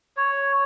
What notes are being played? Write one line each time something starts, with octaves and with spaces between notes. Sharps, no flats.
C#5